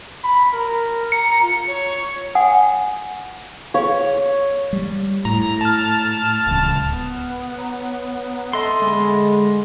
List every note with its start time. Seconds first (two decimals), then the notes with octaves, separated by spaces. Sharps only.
0.24 B5
0.53 A#4
1.12 A#5 C#7
1.43 F4
1.67 C#5
2.35 F#5 G#5 D#6
3.74 G#4 C#5 F5
4.73 G3
5.25 A2 A#5
5.61 A5 F6
6.47 D1 C#2
6.87 B3
7.57 C#5 A#5
8.53 A4 D#5 E5 C6
8.82 D3 G#3 G#4 A4 B5